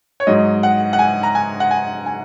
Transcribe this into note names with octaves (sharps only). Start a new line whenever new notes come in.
C#5
G#2 F#3 D#5
F#5
F#5
G#5
A#5
G#5
F#5
G#5
G#5